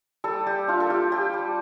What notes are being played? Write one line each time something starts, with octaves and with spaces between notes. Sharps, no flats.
G3 A4
G3 G4
D4 F4
A4
F4 G4
G3 G4
G3